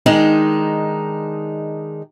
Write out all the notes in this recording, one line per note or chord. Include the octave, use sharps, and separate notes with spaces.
D#3 G#3 D4 D#4